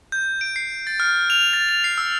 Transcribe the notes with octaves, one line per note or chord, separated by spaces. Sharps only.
G6
D7
C7
A6
F6
F7
A6
F7
C7
E6